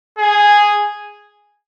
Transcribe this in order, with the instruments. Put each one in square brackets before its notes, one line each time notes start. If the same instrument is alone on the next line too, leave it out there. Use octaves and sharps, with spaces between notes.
[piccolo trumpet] G#4